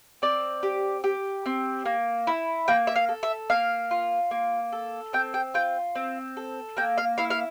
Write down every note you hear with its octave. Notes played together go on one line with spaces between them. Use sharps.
C4 D5
G4
G4
C4
A#3
E4
A#3 G5
E5
F5
A4
E5
A#3 F5
F4
A#3
A4
C4 G5
G5
F4 G5
C4
A4
A#3 G5
F5
E4 F5
F5